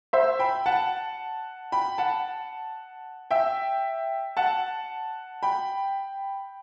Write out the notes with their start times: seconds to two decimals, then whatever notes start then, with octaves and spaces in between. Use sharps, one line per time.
0.13 C5 E5
0.39 G5 B5
0.66 F#5 A5
1.72 G5 B5
1.98 F#5 A5
3.31 E5 G5
4.37 F#5 A5
5.43 G5 B5